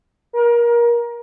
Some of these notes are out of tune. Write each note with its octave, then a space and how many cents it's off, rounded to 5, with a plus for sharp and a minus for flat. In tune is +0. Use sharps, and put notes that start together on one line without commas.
A#4 +25